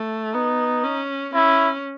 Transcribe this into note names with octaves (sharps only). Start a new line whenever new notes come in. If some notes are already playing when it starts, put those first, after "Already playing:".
Already playing: A3
B3 D#4
C#4
C#4 E4